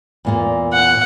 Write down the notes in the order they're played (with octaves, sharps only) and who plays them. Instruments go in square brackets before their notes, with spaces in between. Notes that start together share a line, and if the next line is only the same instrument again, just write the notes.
[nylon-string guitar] E2 A#2 A#3
[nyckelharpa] F#5